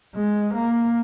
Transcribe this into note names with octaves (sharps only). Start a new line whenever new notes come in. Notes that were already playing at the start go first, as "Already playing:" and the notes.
G#3
A#3